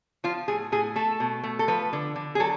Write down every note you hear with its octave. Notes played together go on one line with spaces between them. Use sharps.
F3 F4
A2 G#4
A2 G#4
A3 A4
B2
A3
A4
F3 B4
D3
D3
G#4
F#3 A4